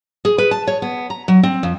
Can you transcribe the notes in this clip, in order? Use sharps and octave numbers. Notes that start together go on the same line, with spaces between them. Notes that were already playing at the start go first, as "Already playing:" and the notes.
G#4
B4
A5
C#5
B3
A#5
F#3
C4
F2